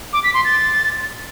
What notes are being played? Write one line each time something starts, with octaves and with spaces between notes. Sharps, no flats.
D6
B6
C6
A6